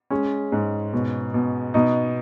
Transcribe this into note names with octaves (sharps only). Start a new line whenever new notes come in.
G#3 C#4
G#2
B2
B2
B2 D#4